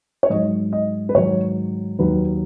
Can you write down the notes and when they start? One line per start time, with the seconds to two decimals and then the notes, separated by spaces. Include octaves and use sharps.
0.23 C#5
0.30 G#2 F#3 D#5
0.73 D#5
1.09 B4
1.14 G#2 D#3 F#3 C#5
1.99 D#2 D#3 F#3 B4